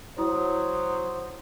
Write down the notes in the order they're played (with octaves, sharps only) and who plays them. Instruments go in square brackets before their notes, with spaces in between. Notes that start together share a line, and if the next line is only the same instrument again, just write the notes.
[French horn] F#3 [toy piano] E4 [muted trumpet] C5 [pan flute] D#6